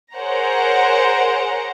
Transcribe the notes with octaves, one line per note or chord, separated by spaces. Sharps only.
G#4 A#4 C5 C#5 F#5 A#5